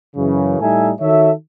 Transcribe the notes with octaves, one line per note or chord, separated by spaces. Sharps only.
F#2 C#3 E3
A2 G3 D#4 A4 E5 G#5
D#3 F#4 A4 C#5 E5